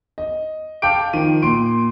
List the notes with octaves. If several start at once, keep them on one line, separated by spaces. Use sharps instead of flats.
D#5
F5 G5 A5 D6 G6 D7
D#3 F3 D#7
A#2 C6 D7